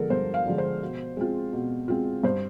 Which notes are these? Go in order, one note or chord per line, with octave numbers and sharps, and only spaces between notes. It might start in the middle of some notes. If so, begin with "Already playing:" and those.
Already playing: D3 F3 G#3 A4 A#4
G2 C5
F5
D3 F3 G#3
C5
B2
G#3 C4 F4
B2
G#3 C4 F4
G2 C5